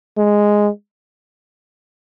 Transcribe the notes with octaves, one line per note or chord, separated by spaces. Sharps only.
G#3